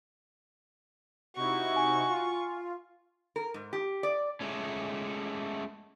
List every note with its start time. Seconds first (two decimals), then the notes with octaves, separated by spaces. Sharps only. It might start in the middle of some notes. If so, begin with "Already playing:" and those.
1.36 C3 D#4 E4 F#4 C#6
1.76 G#5
2.09 F4
3.36 A#4
3.54 G#2
3.73 G4
4.03 D5
4.41 G#3 A3 C#4